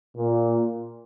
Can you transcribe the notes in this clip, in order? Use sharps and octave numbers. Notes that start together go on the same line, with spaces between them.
A#2